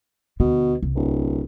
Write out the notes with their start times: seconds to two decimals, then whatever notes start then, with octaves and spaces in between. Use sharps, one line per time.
0.40 D2 B2 D3
0.83 C2
0.95 D1